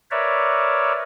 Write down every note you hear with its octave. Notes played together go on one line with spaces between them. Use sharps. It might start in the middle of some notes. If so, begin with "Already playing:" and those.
A#4 B4 C#5 D5 E5